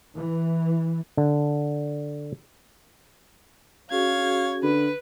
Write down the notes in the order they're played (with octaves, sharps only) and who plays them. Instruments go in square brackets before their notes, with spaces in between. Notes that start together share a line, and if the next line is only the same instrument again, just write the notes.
[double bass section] E3
[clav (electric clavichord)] D3
[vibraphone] C#4 F#4 G#4 [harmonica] C#5 F5 [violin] G#6
[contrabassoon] D3 [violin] B4 [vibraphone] B5